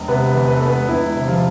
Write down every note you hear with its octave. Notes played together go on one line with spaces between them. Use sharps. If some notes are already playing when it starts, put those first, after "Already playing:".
Already playing: E1
C3 B3 B4
E2
B4
A4
E1 B3 B4
E1 E4
C3
F3 F4